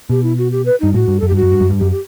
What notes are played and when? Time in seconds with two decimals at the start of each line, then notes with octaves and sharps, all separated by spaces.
0.09 B2 G4
0.23 E4
0.38 F#4
0.52 G4
0.66 B4
0.80 G2 D#4
0.94 A2 F#4
1.08 G2
1.20 F#2 A4
1.28 G4
1.31 G2 F#4
1.42 F#2
1.52 G2
1.61 F#2
1.70 G2
1.79 F#2 G4
1.92 G4